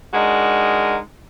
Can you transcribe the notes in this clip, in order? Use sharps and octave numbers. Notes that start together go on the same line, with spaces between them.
G#3 D4 D#4 F#4 A#4